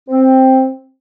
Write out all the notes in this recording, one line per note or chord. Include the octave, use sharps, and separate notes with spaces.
C4